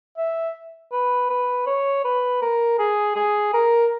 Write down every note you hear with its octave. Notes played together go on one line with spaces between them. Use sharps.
E5
B4
B4
C#5
B4
A#4
G#4
G#4
A#4